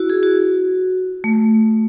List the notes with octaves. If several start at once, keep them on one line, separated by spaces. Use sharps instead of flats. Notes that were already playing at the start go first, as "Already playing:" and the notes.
Already playing: E4 F#4
G#4
F#4
A3